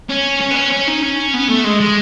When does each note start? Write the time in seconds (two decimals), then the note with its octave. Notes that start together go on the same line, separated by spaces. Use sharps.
0.10 C#4
0.41 C#4
0.51 B3
0.56 C#4
0.72 C#4
0.87 D#4
1.02 C#4
1.34 B3
1.48 A3
1.64 G#3
1.80 G#3